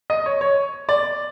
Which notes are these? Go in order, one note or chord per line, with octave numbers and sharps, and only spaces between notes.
D#5
C#5
C#5
D5